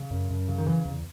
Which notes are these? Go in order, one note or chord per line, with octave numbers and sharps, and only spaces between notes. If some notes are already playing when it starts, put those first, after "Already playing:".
Already playing: C#3
F#2
F#2
C#3
D#3
C#3 E3
E2